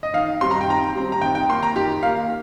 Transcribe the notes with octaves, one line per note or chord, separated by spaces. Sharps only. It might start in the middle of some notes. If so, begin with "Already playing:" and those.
D#5
D#3 F5
G3 C4 C6
A#5
G5
D#3 A#5
G3 C4
A#5
D#3 G5
G5
A#3 C6
A#5
D#3 G4
A#3 F5